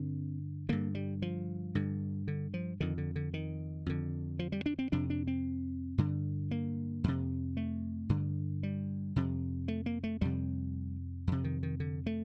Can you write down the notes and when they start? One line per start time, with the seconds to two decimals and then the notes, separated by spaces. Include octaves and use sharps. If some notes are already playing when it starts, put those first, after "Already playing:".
Already playing: G2 D3 C4
0.69 G2 D3 A#3
0.95 G3
1.22 F3
1.75 G2 D3
2.28 D3
2.54 F3
2.80 F2 D3 D#3
2.98 D3
3.16 D3
3.34 D#3
3.86 F2 D3
4.39 F3
4.52 G3
4.66 D4
4.79 C4
4.92 F2 C3 D4
5.10 D4
5.27 C4
5.98 G2 D3
6.51 A#3
7.04 F2 C3
7.57 A3
8.09 G2 D3
8.63 G3
9.16 F2 C3
9.68 A3
9.86 A#3
10.04 A3
10.21 F2 C3 G3
11.27 F2 C3
11.44 D#3
11.63 D#3
11.80 D3
12.06 A3